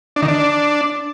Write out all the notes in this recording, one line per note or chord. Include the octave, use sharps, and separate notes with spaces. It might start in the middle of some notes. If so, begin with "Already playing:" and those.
D4
D#3
D4